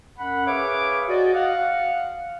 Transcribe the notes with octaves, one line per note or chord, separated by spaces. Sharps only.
F#2 F#5 B5
G#4 B4 C#5 E5 F5 D6
F#4 D5 D#5
F5 F#5